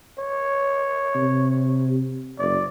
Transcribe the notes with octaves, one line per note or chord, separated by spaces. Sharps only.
C#5
C3
F#1 D5